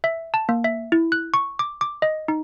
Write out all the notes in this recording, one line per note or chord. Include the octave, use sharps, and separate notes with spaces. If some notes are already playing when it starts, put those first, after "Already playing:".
E5
A5
A#3
E5
E4
F#6
C#6
D6
D6
D#5
D#4